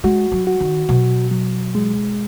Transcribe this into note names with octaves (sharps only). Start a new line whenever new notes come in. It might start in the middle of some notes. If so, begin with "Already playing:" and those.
G#3 F#4
F#3
F#4
D#3
B2 F#3
F#3
G#3